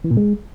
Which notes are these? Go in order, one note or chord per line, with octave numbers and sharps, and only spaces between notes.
E3
A#2
G#3